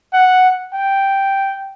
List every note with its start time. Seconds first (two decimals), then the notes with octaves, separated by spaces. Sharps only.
0.13 F#5
0.74 G5